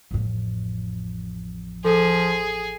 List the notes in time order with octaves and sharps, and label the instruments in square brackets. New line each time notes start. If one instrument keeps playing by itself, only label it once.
[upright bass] A1 F2
[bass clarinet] F3 [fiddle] G#4 [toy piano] A4